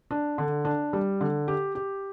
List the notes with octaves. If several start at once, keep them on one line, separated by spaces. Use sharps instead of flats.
D4
D3
D4
G3
D3
G4
G4